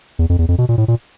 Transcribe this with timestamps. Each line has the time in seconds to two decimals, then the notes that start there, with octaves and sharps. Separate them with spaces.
0.19 E2
0.30 F2
0.39 E2
0.48 F2
0.58 B2
0.69 A#2
0.78 A2
0.88 A#2